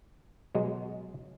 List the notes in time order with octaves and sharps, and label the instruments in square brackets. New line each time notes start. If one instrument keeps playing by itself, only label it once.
[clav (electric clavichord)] B2 F#3 G#3 D#5